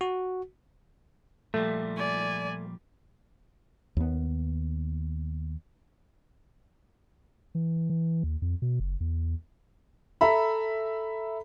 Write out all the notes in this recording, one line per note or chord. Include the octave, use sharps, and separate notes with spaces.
F#4
A#2 F3 G3 A3
D5 G#5
D#2 B3
E3
E3
D#2
F2
B2
F#1
E2
A4 E5 A#5 B5